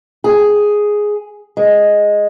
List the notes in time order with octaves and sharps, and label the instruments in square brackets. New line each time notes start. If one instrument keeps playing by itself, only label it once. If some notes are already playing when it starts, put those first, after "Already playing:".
[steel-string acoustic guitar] G#4
G#3